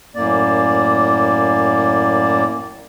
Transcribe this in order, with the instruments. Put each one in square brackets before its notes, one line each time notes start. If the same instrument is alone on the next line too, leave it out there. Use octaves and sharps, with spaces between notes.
[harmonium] F#2 A2 A#3 D5